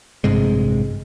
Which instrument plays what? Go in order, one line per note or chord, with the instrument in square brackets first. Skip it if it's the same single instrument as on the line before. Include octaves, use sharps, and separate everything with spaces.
[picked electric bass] A1 G2 C3 G#3